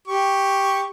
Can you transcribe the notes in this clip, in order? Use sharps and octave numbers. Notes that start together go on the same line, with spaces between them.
G4 C#6